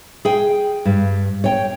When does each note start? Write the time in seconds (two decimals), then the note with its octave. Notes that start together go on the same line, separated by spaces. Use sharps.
0.25 G#4 G5
0.85 G2
1.44 C#5 G5